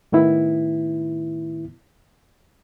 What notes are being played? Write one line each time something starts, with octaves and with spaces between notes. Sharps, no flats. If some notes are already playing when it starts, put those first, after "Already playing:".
A2 D#3 B3 E4